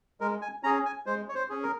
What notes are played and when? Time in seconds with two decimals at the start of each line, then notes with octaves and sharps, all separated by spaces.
0.21 G#3 A#4
0.42 G#5
0.63 C#4 G#4 A#5
0.85 G#5
1.06 G#3 C5
1.29 C#5
1.35 C5
1.49 C#4 G#4
1.63 A#4